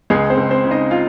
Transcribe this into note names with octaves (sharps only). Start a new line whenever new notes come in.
C#2 G#3 G#4
C4 C5
C#2
C4 C5
C#3
D#4 D#5
F4 F5